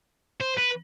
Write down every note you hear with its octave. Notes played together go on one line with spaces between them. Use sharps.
C5
B4